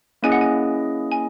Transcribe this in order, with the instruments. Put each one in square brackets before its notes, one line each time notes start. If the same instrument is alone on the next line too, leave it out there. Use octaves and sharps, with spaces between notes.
[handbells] A#3 C#4 E4 G#4 D#5 [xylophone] G#5
[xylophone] F#5
G#5
G#5